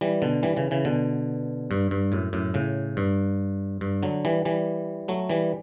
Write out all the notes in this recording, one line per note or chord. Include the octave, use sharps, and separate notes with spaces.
E3 G3
B2 D3
E3 G3
C#3 E3
C#3 E3
B2 D3
G2
G2
F#2 A2
F#2 A2
A2 C#3
G2
G2
D3 F#3
E3 G3
E3 G3
F#3 A3
E3 G3